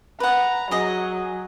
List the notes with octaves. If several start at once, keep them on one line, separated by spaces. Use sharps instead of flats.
B4 F#5 A#5
F#3 G#4 D#5